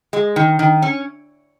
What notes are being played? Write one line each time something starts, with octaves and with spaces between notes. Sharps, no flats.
G#3
D#3
D#3
C#4